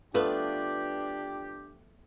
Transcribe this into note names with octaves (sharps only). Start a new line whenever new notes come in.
F3 A3 B3 D4 F4 G4 B4